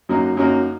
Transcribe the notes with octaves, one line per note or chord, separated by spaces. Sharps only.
F#2 F#3 A#3 D#4
F#2 F#3 A#3 D#4